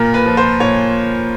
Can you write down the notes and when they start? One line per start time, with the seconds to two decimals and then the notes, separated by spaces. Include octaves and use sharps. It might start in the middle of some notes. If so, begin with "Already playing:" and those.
Already playing: A#2 A#4
0.14 B4
0.26 F3
0.37 C5
0.60 A#2 C#5